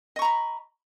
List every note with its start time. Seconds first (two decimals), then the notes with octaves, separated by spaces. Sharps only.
0.16 D#5
0.19 C#6
0.22 A#5
0.25 B5